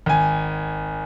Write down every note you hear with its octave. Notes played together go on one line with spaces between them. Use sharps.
G#1 G#5